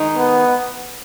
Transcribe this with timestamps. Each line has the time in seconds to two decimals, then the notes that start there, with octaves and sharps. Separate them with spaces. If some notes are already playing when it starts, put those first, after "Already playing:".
Already playing: D#3 G#3 D#4
0.18 B3